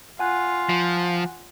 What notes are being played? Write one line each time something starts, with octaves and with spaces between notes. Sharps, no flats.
F4 F#5 G#5 F#6
F3